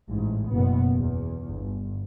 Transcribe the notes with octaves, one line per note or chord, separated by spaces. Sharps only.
A1 G#2
F#1 B2 B3
E2
G1